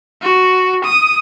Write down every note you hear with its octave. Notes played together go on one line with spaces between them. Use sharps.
F#4
D#6